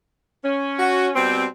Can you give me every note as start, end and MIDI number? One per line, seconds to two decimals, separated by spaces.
0.44 1.14 61
0.78 1.08 66
1.16 1.46 47
1.16 1.46 55
1.16 1.46 60